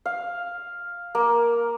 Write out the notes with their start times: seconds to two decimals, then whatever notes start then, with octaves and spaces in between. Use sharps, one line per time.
0.06 F5
1.15 A#3